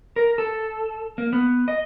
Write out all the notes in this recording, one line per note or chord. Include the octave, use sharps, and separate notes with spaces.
A#4
A4
A#3
B3
D#5